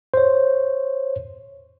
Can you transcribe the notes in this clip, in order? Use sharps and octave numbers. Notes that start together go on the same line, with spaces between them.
C5 C#5